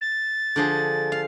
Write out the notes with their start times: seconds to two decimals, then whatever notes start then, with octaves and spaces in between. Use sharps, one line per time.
0.01 A6
0.56 D3 F3 G#4
1.12 F5